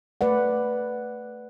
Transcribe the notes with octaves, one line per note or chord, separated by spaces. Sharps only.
A3 B4 D5 F#5